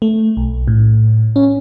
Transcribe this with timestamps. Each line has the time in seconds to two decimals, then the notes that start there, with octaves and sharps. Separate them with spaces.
0.02 A3
0.37 B1
0.67 A2
1.36 C#4